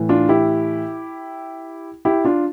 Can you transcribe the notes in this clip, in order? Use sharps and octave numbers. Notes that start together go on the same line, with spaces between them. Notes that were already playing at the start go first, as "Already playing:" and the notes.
Already playing: A2 E3
D4 F4
E4 G4
E4 G4
D4 F4